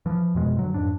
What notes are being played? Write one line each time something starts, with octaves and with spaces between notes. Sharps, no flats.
E3 F3
F2 B2 G#3
G2 D3 F#3
F2 G#2 D4